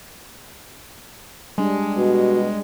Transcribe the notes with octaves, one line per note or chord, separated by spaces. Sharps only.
G3 G#3 D4
B2 F#4